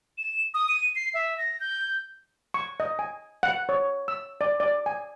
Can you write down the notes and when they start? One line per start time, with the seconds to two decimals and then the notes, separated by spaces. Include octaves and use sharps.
0.18 E7
0.54 D#6
0.69 D#7
0.96 C7
1.14 E5
1.38 A#6
1.60 G6
2.54 C#6
2.80 D#5
2.99 G#5
3.43 F#5
3.69 C#5
4.08 E6
4.41 D5
4.60 D5
4.86 G#5